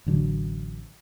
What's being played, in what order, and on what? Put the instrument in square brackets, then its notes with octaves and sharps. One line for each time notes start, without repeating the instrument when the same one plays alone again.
[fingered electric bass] A1 D3 F#3